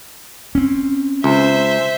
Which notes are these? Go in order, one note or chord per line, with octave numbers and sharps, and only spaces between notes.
C4 C#4
C#2 C5 E5